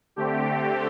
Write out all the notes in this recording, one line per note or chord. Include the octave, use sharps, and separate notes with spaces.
D3 A3 C4 G4
G4